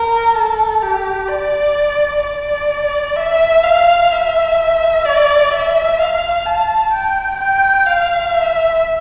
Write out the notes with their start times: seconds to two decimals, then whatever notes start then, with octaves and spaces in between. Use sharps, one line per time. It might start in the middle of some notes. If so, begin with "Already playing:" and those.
Already playing: A#4
0.35 A4
0.82 G4
1.29 D5
2.23 D5
3.16 E5
3.64 F5
4.11 E5
5.05 D5
5.51 E5
5.99 F5
6.46 A5
6.93 G5
7.40 G5
7.87 F5
8.34 E5